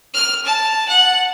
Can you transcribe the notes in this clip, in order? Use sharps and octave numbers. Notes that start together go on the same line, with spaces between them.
F6
A5
F#5